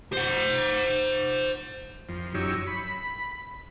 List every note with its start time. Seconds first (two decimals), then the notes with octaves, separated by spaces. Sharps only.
0.13 C5 F#5
2.09 F2
2.35 F#2 D#4 G4 C#5 E6
2.67 B5